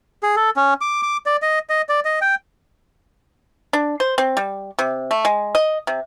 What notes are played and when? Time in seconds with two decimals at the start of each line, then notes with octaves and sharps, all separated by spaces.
0.23 G#4
0.36 A4
0.57 C#4
0.81 D6
1.03 D6
1.26 D5
1.42 D#5
1.69 D#5
1.89 D5
2.05 D#5
2.22 G5
3.73 D4
4.00 C5
4.18 C4
4.37 G3
4.79 C3
5.11 A3
5.25 G#3
5.55 D#5
5.87 C3